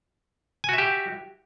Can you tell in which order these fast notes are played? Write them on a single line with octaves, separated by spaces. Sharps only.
G#5 F#4 E5 G4